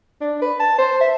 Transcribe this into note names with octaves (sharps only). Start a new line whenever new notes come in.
D4
B4
A5
C5
E5